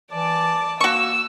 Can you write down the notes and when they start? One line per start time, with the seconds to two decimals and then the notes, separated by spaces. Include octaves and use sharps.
0.12 E3 D5 A5 D6
0.81 A#3 F#4 C#6 E6